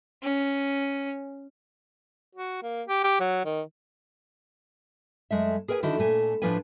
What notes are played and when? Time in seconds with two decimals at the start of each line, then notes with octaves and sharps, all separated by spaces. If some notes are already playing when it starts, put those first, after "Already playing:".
0.23 C#4
2.35 F#4
2.63 A#3
2.88 G4
3.04 G4
3.20 F#3
3.45 D#3
5.31 F#2 G#3 A3 E5
5.68 G#4 A#4 B4 E5 G#5
5.83 D3 D#3 E4 F#4 A4
5.99 A#2 A3 G#5
6.42 A2 F3 D4 F4 B4 G#5